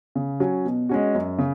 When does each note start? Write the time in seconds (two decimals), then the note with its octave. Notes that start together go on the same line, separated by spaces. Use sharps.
0.15 C#3
0.40 F#3 C#4
0.65 B2
0.89 G#3 C#4 F#4
1.15 F#2
1.38 C#3